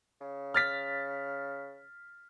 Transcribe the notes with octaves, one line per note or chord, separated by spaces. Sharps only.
C#3
F6 A6 B6